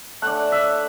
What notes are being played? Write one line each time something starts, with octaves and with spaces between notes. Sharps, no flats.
A3 D4 F#5
E5